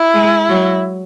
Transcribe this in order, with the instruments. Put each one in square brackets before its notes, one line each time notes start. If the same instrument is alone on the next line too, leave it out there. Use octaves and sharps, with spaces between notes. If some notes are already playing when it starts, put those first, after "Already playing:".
Already playing: [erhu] E4
[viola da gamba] G#3
F#3